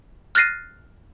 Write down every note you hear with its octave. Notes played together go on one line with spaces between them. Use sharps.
F6 F#6 A6 A#6 C7 D#7